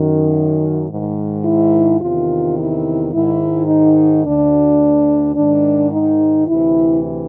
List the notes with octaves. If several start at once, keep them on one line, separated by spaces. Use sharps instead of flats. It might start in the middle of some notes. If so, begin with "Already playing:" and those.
Already playing: F#2 D#3
G#2 D#3
E4
E2 C3 D#3 F4
E4
G#2 D#3 E4
D#4
D2 D3 D4
G#2 D#3 D4
D#4
D2 C3 E3 E4